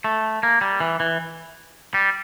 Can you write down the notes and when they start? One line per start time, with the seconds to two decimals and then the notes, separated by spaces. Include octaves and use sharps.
0.04 A3
0.43 A#3
0.61 G3
0.80 E3
1.00 E3
1.94 G3